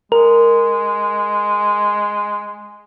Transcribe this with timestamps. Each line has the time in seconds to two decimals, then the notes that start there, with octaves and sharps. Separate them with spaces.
0.12 G#3 A#4